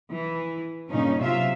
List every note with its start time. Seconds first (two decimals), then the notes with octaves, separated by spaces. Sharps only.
0.12 E3
0.90 G2 A#2 C#3 C#4 D#4
1.20 C3 F#3 F4 E5 F5